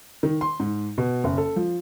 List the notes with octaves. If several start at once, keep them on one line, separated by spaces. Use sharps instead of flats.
D#3
C6
G#2
B2
F#1
A4
F3